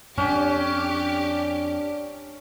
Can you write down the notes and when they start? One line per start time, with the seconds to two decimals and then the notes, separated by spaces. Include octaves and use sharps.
0.17 F2 C#4 D4 G4